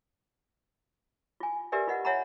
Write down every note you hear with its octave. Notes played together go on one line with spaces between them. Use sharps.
F4 G#5
G4 A#4 B4 D5 E5 G#5
F4 B4 D#5 F#5
C#5 E5 F#5 G#5 A#5 B5